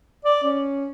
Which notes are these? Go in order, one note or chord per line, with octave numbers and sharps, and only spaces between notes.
D5
C#4